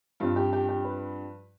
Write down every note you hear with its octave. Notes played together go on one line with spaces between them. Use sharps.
G2 F3 C4 F4
G4
G4
G4
B4